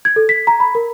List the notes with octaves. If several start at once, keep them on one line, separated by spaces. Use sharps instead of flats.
G#6
A4
B6
A#5
B5
A#4